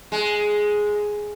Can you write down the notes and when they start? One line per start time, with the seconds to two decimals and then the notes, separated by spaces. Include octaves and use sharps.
0.12 G#3